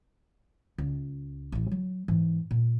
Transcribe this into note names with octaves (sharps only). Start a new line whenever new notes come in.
C#2
A1 E4
F#3
G#2 E3
A#2